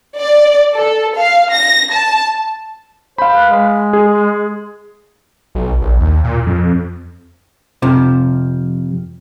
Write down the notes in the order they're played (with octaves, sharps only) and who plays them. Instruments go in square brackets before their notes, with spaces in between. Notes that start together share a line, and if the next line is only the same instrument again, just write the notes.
[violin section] D5
A4
F5
A#6
A5
[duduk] C5 [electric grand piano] F5 B5
[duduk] B4
G#3
[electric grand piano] G#4
[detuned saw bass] B1
A#1
D#2
A#2
F2
[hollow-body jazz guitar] F2 C3 F3